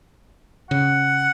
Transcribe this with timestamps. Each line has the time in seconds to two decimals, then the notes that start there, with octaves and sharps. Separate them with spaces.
0.71 C#3 F#5